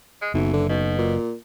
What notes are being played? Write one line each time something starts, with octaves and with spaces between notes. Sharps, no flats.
G#3
F#1 B1 E3
D3
B1 B2
A#2